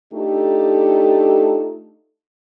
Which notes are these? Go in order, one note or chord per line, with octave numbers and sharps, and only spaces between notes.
A3 D4 D#4 F4 G4 A4